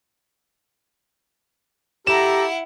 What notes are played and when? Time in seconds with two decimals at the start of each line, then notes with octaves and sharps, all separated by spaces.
2.07 E4 G4 A4 F#5 A#5 E7